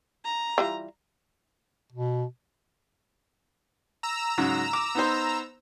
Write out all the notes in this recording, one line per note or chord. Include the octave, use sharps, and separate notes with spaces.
A#5
E3 G3 F4
B2
A#5 E6
G#2 C#3 F#3
D6
B3 D#4 C5